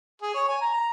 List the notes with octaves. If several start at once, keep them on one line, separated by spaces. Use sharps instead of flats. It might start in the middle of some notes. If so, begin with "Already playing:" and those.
G#4
C#5
G#5
A#5
A#5